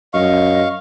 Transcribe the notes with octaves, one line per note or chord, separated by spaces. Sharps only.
F#2 D#5 F5 C#6